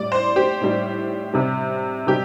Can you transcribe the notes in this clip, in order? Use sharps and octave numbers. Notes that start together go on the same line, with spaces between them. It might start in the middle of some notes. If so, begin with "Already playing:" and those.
Already playing: A2 G3 D5
C5
G4
A2 G3
C3 G3
C3 G3 G4